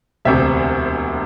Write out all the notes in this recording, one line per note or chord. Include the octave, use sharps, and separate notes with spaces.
E1 D2 C3 E5